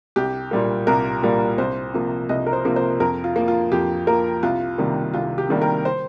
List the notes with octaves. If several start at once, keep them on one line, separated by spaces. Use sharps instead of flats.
C2 G4
A#2 G3 A#3
C2 A#4
A#2 G3 A#3
C2 C5
C3 F3 A#3
C2 D#5
A#4
C5
C3 F3 A#3
C5
F2 A#4
F4
F3 A#3
F4
F2 G4
F3 A#3 A#4
C2 F4
C3 D#3 G3 A#3
C2 F4
G4
C3 D#3 G3 A#3
A#4
C5